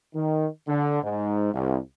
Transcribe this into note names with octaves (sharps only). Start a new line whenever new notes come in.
D#3
D3
G#2
C2